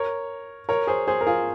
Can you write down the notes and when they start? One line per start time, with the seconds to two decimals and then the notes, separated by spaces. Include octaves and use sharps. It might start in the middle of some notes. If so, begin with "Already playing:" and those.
Already playing: A#4 C#5
0.69 A#4 C#5
0.87 G#4 C5
1.07 G#4 C5
1.21 A#4
1.27 F4 G#4